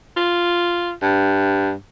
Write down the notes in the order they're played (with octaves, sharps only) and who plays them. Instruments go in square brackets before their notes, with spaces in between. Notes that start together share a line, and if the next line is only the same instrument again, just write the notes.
[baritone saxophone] F4
G2